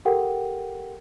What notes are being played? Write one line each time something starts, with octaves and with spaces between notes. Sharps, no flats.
G4 A4 A#4 F#5 G5